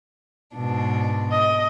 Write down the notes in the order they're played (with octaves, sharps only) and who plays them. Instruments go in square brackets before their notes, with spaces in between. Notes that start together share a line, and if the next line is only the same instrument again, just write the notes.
[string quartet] G#2 B2 D4
[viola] D#5